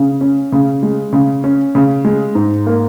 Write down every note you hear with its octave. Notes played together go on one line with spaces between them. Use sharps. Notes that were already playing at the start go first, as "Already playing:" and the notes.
Already playing: C#3
C#4
C#3
G#3
C#3
C#4
C#3
G#3
G#2
A#3